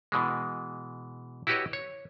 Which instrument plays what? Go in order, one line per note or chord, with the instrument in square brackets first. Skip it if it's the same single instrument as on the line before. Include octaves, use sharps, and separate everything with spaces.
[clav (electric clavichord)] B2 E3 G#3
E4 F#4 G4 B4 C#5 D#5
C#5